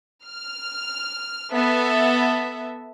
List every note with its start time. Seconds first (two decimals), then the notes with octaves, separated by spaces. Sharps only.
0.26 F6
1.53 B3 A4 E5